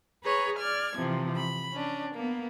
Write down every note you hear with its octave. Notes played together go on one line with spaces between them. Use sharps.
G#4 B4 C#5 A#5
D5 F6 G#6
C3 E3 F3
B5
C#4 D4
A#3 B3